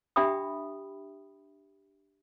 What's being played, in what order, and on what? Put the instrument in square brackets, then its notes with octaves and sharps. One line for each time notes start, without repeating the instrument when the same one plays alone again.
[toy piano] D4 G4 E5 G5 B5 D#6